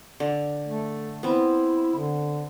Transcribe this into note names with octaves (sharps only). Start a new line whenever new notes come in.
D3
A3
B3 C4 E4
D3